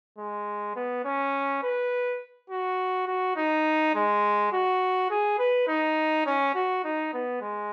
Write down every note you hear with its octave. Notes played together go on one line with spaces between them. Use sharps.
G#3
B3
C#4
B4
F#4
F#4
D#4
G#3
F#4
G#4
B4
D#4
C#4
F#4
D#4
B3
G#3